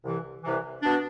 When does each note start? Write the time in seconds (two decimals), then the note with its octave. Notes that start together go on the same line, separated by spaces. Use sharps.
0.03 C2 C3 E3
0.43 C2 C3 E3
0.82 B2 B3 D4